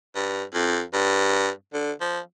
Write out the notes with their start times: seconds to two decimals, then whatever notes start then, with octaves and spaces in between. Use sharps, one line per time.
0.15 G2
0.54 F2
0.94 G2
1.73 D3
2.01 F3